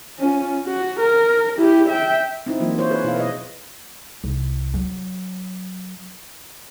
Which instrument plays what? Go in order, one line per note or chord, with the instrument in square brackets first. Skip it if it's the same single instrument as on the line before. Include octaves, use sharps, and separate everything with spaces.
[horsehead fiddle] C#4 F4
F#4
A#4
E4 G4
E5 G5
[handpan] C4 D#4 E4
E3 F#3 A#3 F4
E4 C5 C#5
G#4 B4 C#5
B2 E4 F5
B4 D#5
[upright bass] C2
F#3